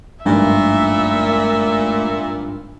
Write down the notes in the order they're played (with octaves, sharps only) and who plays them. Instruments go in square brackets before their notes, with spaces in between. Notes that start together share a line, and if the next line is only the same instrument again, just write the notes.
[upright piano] G#1 G2 F3 [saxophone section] A#2 [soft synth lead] A3 [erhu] E5